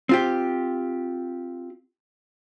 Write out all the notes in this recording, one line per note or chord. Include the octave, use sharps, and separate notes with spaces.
C4 F4 G4